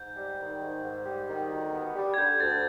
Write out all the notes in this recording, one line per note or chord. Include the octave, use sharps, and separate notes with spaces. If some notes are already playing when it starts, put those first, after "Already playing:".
Already playing: G#2 G6
G3
D#3
G#2
G#2
G3
D#3
D2
B3
G3
G#6
D3 G6
D2 A6